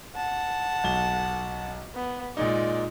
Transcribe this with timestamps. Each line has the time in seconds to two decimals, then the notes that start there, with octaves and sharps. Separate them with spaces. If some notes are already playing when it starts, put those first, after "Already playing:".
0.16 F#5 A5
0.84 B1 G7
1.95 B3
2.37 A#2 G#3 D#4 D5